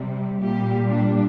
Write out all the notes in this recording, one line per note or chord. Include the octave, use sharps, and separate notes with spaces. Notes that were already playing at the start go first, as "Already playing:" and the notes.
Already playing: C3 G3
A#2 G3 G4
D4